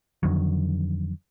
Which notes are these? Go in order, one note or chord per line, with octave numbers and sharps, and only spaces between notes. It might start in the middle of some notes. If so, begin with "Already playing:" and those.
F2 D3 D#3 F#3